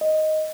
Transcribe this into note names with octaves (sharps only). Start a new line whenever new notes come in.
D#5